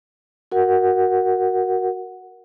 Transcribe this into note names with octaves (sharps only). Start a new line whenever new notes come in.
F#4 A#4 F#5